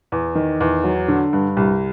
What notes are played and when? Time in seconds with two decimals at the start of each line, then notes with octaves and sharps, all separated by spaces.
0.12 E2
0.35 D#3
0.60 E2
0.84 F#3
1.08 D3
1.33 G2
1.57 C2